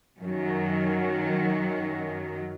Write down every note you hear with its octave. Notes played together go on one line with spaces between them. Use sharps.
F#2 D#3 F#3